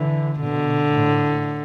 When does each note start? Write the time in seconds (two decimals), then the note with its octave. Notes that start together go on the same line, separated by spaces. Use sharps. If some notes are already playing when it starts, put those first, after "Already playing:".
Already playing: D3 E3
0.41 B2 D3
0.90 A2